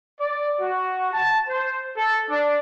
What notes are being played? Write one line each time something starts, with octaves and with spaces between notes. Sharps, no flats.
D5
F#4
A5
C5
A4
D4